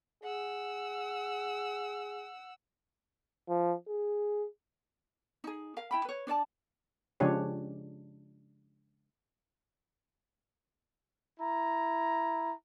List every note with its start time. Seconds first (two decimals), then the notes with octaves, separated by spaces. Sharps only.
0.23 G#4 F#5 E6
3.49 F3
3.89 G#4
5.44 D#4 G#4
5.77 A#4 F5
5.91 E4 G5 B5
6.05 B4 C#5
6.27 D4 C#5 D5 A5
7.20 C#3 F3 G#3 D4 G4 C#5
11.40 E4 A#5